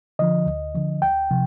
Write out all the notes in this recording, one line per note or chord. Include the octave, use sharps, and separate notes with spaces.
D3 F3 D#5
D2
D3 F3
D2 G5
C3 F3